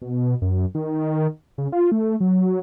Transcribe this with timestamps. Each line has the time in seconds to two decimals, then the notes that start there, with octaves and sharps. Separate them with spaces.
0.02 B2
0.42 F#2
0.75 D#3
1.58 C#3
1.72 F4
1.92 A3
2.20 F#3